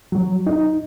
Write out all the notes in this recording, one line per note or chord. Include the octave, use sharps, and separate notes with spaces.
F#3
D#4